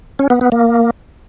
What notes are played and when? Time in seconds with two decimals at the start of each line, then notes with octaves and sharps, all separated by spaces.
0.19 C#4
0.30 B3
0.41 B3
0.52 A#3